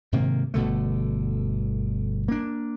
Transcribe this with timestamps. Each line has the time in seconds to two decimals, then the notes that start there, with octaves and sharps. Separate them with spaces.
0.12 G#2 C3 D#3 A#3
0.54 G1 B2 D3 A3
2.28 A#3 D4